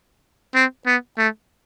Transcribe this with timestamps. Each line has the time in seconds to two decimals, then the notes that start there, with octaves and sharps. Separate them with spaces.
0.55 C4
0.87 B3
1.18 A3